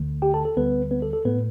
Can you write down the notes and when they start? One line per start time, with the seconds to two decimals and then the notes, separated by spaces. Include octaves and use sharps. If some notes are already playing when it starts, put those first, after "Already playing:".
Already playing: D2 D3 A3
0.22 G4 G5
0.34 A4 A5
0.45 A4
0.57 D2 D3 G3 B3 B4
0.91 B3 B4
1.02 A4
1.13 A4
1.25 A2 A3 B3 B4